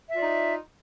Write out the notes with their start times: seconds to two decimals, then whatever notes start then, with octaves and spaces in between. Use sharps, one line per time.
0.10 E5
0.14 F4
0.18 D5
0.21 D#4